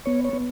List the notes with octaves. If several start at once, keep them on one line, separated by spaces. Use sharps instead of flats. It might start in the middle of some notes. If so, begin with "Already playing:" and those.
B3 C#5
C#5
B3